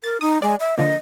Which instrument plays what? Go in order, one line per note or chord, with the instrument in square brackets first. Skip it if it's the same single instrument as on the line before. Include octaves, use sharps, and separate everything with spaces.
[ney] A#4 [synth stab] A6
[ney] D#4 [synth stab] D#6
[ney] G#3 [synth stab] D5
[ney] E5
[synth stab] D3 F3 A#3 [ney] D#5